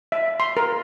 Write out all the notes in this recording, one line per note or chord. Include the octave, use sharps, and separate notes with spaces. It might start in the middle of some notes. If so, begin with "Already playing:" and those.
E5
C6
A#4